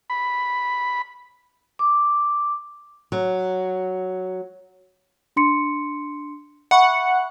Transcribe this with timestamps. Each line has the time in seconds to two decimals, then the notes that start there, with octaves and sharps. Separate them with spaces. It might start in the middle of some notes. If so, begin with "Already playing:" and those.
0.10 B5
1.79 D6
3.12 F#3
5.36 D4 C6 C#7
6.71 E5 F#5 B5 C#6